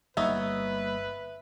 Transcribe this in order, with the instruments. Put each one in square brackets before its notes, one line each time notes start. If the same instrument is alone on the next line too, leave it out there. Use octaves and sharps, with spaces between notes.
[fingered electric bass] G1 G3 A#3 [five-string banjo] B3 D#4 C#5 [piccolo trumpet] B4 [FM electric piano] E5